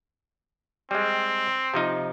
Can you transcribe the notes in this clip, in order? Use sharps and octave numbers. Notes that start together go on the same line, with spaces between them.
G3 G#3 C4
C3 F3 D#4